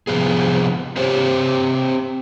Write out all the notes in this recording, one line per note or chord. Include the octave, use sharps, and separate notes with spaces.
C3 F3 B3 G#4
C4 G4 C5 C#5